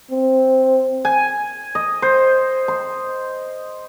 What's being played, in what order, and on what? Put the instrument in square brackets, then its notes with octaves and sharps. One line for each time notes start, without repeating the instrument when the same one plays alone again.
[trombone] C4
[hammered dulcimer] G#5
D#5
C5
C6